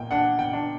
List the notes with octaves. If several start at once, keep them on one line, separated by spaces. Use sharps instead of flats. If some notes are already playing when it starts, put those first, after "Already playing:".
Already playing: A#2 G5
D4 F#5
G5
D4